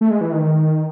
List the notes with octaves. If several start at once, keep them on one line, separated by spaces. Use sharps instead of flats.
A3
G#3
E3
D#3